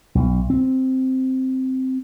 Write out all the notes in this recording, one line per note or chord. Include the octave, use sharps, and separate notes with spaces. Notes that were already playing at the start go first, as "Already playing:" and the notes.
B1
C4